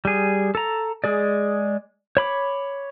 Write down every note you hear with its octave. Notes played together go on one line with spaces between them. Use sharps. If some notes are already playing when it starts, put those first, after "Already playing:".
G3 G#4
A4 A#5
G#3 G#4 D5
C#5 B5 D6